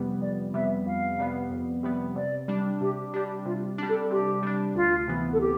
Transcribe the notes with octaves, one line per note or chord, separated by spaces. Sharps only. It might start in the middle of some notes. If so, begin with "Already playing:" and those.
Already playing: F2 C3 G3 B3
F2 D5
C3 G3 B3 E5
F2 F5
C3 G3 B3
F2
C3 G3 B3
C3 D5
G3 D4
C3 G4
G3 D4 G4
C3 F4
G3 D4
A4
C3 G4
G3 D4
D2 F4
C3 E3 B3
A4
G4